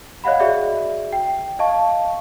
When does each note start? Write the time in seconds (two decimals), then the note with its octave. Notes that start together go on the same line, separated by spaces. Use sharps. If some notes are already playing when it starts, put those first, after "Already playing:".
0.24 C#5 D#5 F5 F#5 B5
0.40 F#4 G#4 D5 E5
1.13 G5
1.59 D#5 F5 A5 C#6